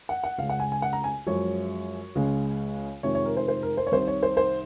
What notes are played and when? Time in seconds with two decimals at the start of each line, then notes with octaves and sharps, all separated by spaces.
0.09 F#5
0.24 F#5
0.38 C#2 C#3 G#3 F5
0.49 F#5
0.60 G#5
0.72 G#5
0.82 F#5
0.93 A#5
1.04 G#5
1.27 F#2 F3 G#3 C#5
2.15 C#2 C#3 G#3
3.03 F2 C3 D#3 G#3 C#5
3.15 C#5
3.25 A#4
3.37 C5
3.48 C5
3.63 A#4
3.77 C5
3.87 C#5
3.92 C2 C3 D#3 C5
4.07 C#5
4.23 C5
4.37 C5